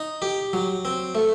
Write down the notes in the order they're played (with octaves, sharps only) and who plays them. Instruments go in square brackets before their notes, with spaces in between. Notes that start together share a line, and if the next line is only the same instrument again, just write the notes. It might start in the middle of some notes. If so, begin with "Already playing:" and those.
Already playing: [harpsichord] D#4
G4
F#3
C4
A3